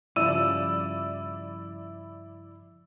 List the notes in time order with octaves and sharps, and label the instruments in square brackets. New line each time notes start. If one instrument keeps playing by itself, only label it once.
[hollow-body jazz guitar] G2 C#3 F3 [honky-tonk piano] E4 D5 [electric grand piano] E6 D#7